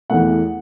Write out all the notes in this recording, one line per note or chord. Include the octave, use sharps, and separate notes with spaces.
E2 E3 A3 F#5